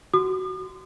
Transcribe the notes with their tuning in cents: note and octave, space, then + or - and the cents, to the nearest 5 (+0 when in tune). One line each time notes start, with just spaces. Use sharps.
F#4 +15 D#6 -45